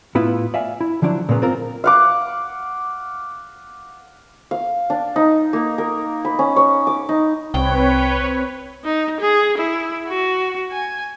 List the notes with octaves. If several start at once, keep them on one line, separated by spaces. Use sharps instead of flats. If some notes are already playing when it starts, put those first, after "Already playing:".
A2 B3 E4 F4
D5 E5 F5 G#5
E4
D3 F3 F#3 D4 E4
A#2 C#3 A#3 B3
C4 F4 A#4
F5 F#5 D6
F5
D4
D#4
A#3
A#4
B5
C#4
C#5
D6
D#4
C2 C4 B4 C#5 G5
D#4
G#4
E4
F#4
G#5